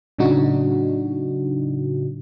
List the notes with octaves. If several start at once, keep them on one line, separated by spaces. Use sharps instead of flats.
A2 C#3 F#3 D4 D#4 F#4